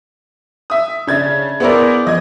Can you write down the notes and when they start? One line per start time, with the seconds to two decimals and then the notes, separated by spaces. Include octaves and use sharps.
0.70 E5 D#6
1.07 C#3 D4 E5 G#6 A6
1.60 B3 E4 G#4 A#4 C5 D5
2.07 F3 D#5 G#6